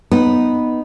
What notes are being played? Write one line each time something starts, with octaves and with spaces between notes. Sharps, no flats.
B3 D#4 B4